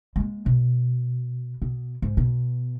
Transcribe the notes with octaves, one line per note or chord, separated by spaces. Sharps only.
G#3 A#3
B2
B2
G#2
B2